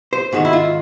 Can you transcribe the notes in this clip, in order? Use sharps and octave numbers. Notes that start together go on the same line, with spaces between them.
C5
G#2 D#3 G#3 F#4
E4
F4